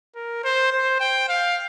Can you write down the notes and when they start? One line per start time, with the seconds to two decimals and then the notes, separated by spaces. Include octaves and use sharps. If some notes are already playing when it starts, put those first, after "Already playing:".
0.16 A#4
0.44 C5
0.72 C5
1.00 G5
1.28 F5